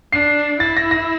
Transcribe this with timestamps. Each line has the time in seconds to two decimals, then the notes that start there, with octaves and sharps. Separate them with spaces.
0.13 D4 C7
0.60 E4 A6
0.77 A#6
0.91 A#6